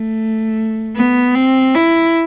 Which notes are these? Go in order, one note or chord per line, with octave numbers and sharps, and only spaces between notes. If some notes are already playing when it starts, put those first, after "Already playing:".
Already playing: A3
B3
C4
E4